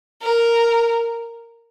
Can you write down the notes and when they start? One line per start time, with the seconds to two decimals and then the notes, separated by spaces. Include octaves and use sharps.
0.22 A#4